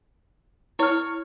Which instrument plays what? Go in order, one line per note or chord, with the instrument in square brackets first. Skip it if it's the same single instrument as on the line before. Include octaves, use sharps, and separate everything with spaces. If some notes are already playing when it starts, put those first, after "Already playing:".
[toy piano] E4 [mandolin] C#5 F6